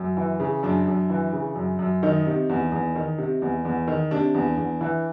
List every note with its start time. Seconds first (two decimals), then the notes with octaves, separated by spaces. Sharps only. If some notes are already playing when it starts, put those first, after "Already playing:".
Already playing: F#2
0.17 E3
0.40 C#3
0.63 F#2 D4
0.87 F#2
1.10 E3
1.33 C#3
1.56 F#2
1.79 F#2
2.03 D#3 D#4
2.26 C3
2.49 E2
2.72 E2
2.96 D#3
3.18 C3
3.42 E2
3.65 E2
3.88 D#3
4.11 C3 D4
4.34 E2
4.57 E2
4.81 E3